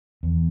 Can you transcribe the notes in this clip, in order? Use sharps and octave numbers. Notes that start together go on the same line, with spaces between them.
E2